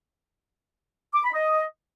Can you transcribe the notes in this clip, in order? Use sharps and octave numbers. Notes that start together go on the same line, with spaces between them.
D6
B5
D#5